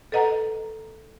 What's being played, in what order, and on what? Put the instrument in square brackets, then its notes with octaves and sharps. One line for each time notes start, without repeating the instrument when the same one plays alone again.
[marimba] A4 B4 D#5 F#5 A#5